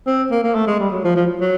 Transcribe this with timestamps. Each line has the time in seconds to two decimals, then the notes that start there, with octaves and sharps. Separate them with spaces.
0.07 C4
0.31 A#3
0.44 A#3
0.55 A3
0.67 G#3
0.80 G3
0.92 F#3
1.04 F3
1.16 F3
1.41 F#3